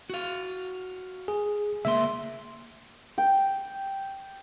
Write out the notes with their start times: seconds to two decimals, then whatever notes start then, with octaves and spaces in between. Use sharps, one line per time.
0.10 F#4 F5
1.28 G#4
1.85 C#2 A#3 E5 C6
3.18 G5